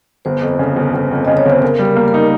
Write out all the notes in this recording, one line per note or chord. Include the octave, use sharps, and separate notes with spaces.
G1 C5
F2
C#3
G1
G1
F2
C#3 D#5
C#5
G1 C5
C#3 A#4
G3
A#4
A#3
A#4
D#4